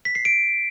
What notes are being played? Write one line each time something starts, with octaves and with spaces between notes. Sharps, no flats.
B6
C7
D7